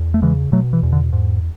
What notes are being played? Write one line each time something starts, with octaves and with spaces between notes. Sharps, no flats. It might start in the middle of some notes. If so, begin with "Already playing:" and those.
Already playing: E2
A3
C#3 E3 G#3
B2 F#3 A3
E3
E2
D3
G#2